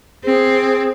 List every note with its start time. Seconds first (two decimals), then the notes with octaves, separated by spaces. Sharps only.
0.24 C4 G#4